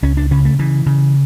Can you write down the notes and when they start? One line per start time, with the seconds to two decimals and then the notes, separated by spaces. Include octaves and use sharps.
0.03 C#2 C#4
0.17 D4
0.31 C#3 C#4
0.45 A3
0.59 C#3 E3
0.86 C#3